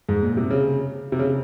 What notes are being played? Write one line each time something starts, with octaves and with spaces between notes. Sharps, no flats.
G#2
A#2
C3
C#3
C3
C#3